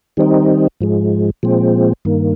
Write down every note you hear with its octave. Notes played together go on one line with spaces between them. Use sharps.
D#3 G3 C4 D#4
G#2 F3 G#3
A#2 F3 G#3 C4
G2 D#3 A#3